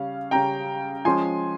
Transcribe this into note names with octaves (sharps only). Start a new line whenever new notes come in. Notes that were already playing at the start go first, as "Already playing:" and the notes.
Already playing: C#3 G3 C#4 F5
C#3 G3 C#4 G5 A#5
F3 G#3 C#4 G#5 C6